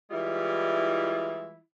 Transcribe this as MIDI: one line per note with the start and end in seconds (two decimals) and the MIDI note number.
0.11 1.57 52
0.11 1.57 55
0.11 1.57 56
0.11 1.57 64
0.11 1.57 65